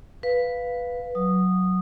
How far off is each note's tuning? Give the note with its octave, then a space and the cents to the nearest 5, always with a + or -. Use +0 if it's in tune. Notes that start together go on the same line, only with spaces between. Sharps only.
B4 +0 F5 +0
F#3 +0 D#6 -10